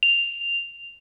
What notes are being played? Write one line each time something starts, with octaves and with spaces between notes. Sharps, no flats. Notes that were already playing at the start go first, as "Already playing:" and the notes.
F7